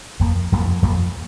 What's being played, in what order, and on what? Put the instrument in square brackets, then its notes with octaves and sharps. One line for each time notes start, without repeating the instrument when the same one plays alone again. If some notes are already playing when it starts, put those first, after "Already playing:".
[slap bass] F2 F3 A#3
F2 F3 A#3
F2 F3 A#3